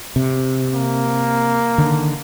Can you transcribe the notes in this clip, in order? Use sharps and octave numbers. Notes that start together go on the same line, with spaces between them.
C3
A#3
D3 D#3